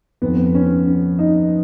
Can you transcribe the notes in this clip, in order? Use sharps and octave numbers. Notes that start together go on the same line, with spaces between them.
F2 D#3 B3
C#4
C#4
D#4